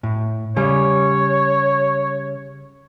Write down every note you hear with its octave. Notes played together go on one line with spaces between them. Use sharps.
A2
C#3 G3 C#5